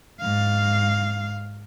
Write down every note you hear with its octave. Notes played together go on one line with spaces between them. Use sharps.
G#2 F5